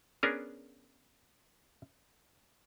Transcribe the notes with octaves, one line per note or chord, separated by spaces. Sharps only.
B3 C#4 D4 G#4 A#4